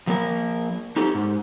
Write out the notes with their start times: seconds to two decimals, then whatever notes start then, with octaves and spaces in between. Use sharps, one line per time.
0.07 F3 A#3 A#4
0.96 D#4 G4 A4
1.15 G#2